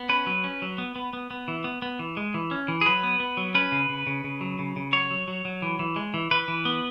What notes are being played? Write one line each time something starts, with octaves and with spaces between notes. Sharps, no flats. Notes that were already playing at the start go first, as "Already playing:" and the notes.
Already playing: B3
C#4 B4
F#3
C#4
F#3
B3
B3
B3
B3
E3
B3
B3
E3
G#3
E3
C#4
E3
G#4
F#3 B4
B3
B3
F#3
C#4 B4
C#3
C#3
C#3
C#3
F#3
C#3
C#3
F#3 C#5
F#3
F#3
F#3
E3
E3
G#3
E3
E3 B4
E3
B3